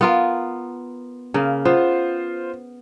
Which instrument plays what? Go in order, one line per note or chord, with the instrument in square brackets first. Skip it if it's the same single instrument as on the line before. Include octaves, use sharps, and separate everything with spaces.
[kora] B3 F4 A#4
C#3 A#3
[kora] B3 [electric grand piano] F4 C5